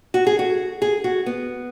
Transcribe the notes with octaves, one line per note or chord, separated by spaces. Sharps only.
F#4
G#4
F#4
G#4
F#4
B3